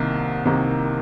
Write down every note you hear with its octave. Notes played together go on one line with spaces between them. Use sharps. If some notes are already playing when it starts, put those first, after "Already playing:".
Already playing: C2 C3 D#3 A#3
C2 C3 D#3 A#3